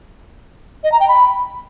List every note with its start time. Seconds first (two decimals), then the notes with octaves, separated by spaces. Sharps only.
0.83 D#5
0.92 A#5
1.00 G5
1.08 B5